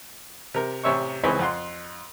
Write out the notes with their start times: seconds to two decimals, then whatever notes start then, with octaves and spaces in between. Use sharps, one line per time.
0.54 C3 A#4
0.84 A1 C3 C#5 E5 C#6
1.24 C#2 E3 C4 G#4 C#5 B5
1.39 F2 F#5 C6